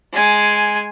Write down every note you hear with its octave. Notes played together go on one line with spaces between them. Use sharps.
G#3 G#5